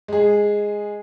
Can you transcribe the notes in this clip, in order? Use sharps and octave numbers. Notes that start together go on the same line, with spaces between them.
G#3 G#4